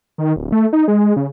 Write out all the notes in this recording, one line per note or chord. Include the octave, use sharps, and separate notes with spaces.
D#3
D1
A3
D#4
G#3
C#3